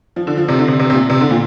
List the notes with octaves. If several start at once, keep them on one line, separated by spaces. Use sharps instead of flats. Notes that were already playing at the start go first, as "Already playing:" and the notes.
F3
D3
F3
C3
D3
C3
C3
C3
A#2
C3
D3
A#2